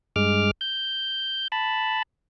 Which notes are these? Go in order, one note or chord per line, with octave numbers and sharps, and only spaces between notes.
G2 G#3 D6 F6
G6
A5 B5